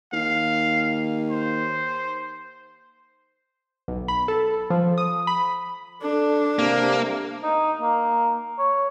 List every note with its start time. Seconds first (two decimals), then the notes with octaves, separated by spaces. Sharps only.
0.12 D#2 F5
1.30 C5
3.88 B1
4.08 B5
4.28 A4
4.70 F3
4.98 D#6
5.27 B5
6.02 D4 A4
6.59 C3 A#3
7.43 D#4
7.81 A#3
8.58 C#5